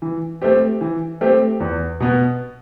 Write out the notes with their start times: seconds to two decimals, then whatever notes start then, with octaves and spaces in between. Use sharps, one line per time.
0.02 E3
0.42 A3 C4 G4
0.81 E3
1.21 A3 C4 G4
1.60 E2
2.00 B2 B3